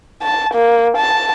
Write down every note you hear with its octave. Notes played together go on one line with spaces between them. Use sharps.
A5
A#3
A5